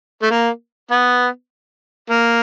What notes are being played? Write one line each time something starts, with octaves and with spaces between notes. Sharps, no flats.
A3
A#3
B3
A#3